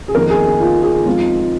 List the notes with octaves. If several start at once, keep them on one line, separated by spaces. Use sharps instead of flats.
G#4
F2 D#3 A#3 A#4
G#4
G#4
F4
G#4
G#2 F3 C4 D#4 F4